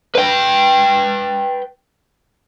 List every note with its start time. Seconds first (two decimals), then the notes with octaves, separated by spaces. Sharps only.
0.15 B4 G5